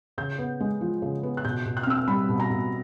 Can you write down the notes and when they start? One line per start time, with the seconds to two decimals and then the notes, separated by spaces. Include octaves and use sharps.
0.18 C#3 G6
0.39 B3
0.60 G#3
0.81 F3
1.02 C#3
1.23 B3
1.37 F#6
1.45 B2 G6
1.65 B2
1.77 F#6
1.83 F6
1.87 C4 E6
1.97 F6
2.08 G3 B5
2.29 B2
2.40 A#5
2.50 B2